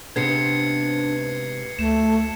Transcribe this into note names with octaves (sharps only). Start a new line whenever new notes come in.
G#2 C3 B3 D4 G#6 C7 C#7
D2 A3 E7